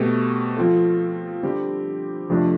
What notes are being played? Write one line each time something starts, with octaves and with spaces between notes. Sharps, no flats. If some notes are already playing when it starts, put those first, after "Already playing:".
Already playing: B2 A3 C4 G4
F3 C4 F4 A4
D3 G3 C4 G4
F2 C3 F3 A3 D4